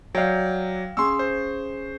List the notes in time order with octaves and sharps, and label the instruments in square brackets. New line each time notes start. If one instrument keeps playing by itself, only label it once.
[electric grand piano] F#3 D5 [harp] F5 G5
[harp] C#4 G#4 [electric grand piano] C6 E6
[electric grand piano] C5